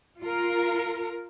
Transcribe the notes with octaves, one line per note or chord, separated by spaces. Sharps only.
F4 A#4